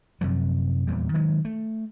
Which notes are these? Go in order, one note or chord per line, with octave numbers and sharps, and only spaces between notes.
F#2 C3 F3 F#3
E2 A#2 G3
D#3 F#3 G#3
A3